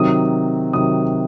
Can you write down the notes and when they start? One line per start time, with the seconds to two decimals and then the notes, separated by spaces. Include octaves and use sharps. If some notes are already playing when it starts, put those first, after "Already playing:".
Already playing: C3 D#3 F#3 D#6
0.73 C3 D#3 F#3 D#6